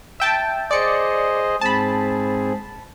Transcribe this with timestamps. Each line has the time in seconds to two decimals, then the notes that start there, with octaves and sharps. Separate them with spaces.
0.20 E5 G5 A5
0.71 G#4 C5 D5 D#5 C#7
1.61 G#2 C4 G#4 A5 B5